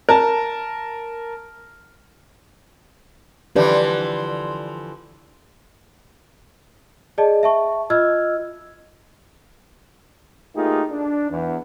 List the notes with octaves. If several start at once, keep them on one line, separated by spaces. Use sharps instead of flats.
A#4 A5
D3 E3 F3 G4 B4 D5
G#4 D5 D#5 A5
E5 A5 C#6
F4 D#5 E6 F6 G#6
A3 A#3 D#4 F4 G4 G#4
D4
E2